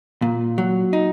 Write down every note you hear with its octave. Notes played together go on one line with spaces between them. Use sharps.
A#2
F#3
D#4